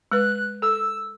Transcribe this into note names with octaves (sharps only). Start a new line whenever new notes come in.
G#3 B4 F#6
A4 E6